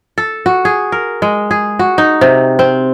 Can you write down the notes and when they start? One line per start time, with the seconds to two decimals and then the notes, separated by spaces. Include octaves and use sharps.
0.18 A4
0.46 F#4
0.65 G#4
0.92 A#4
1.22 G#3
1.51 G#4
1.79 F#4
1.98 D#4
2.21 C3
2.59 C4